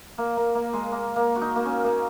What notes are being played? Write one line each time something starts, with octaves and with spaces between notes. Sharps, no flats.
A#3
A#3
A#3
G#3
A#3
A#3
F#4
D#4
A#3
C#4
A#3